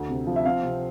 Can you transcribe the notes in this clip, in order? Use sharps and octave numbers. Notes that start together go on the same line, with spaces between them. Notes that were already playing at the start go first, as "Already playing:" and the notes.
Already playing: D2
C3
F3
E5
C4 F5
C3